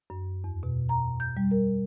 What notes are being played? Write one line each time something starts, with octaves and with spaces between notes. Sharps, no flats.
F#2
E2
B2
A#5
G6
G3
A#4